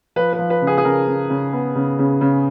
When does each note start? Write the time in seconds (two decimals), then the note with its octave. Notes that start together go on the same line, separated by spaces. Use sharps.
0.16 F3 B4
0.33 B4
0.39 F3
0.50 B4
0.61 C#3
0.67 G#4
0.78 G#4
0.84 C#3 A#4
1.07 C#3
1.30 C#3
1.53 B3
1.75 C#3
1.99 C#3
2.21 C#3